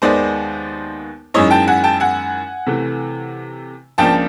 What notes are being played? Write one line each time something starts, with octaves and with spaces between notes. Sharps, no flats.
D#2 D#3 G#3 B3 D#4 C5 D5
F#2 D#3 G#3 C#4 E4 C#5 D#5
G5 A5
F#5 G#5
G5 A5
F#5 G#5
C3 E3 A3
C#2 C#3 F3 A#3 D4 G5 A5